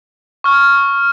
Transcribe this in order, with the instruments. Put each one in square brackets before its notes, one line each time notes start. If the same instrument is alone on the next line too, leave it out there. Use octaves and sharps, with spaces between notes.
[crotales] C#6 F6